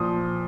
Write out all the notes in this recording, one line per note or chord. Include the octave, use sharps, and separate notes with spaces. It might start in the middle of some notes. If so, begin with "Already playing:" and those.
Already playing: A#2 F3 D#6